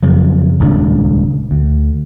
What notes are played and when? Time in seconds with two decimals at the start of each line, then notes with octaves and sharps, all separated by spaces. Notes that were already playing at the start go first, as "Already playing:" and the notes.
0.02 F2 C#3 F#3
0.60 D#1 C#2 D4
1.51 D2